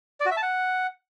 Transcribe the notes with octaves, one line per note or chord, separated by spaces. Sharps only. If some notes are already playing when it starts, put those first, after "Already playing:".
D5
F#4
E5
A5
F#5